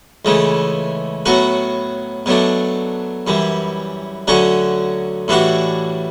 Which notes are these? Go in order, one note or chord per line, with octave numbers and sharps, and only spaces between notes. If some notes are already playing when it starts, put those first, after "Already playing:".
C#2 C#3 E3 A3
A2 F#3 B3 F#4
B2 F#3 A3 D4
F#2 E3 G3
D2 D3 F#3 C#4 F#4
A2 E3 G3 D4 F#4